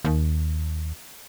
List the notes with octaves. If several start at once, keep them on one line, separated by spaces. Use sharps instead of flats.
D#2